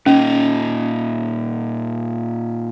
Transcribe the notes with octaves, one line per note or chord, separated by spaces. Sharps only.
A#2 C#4 D#4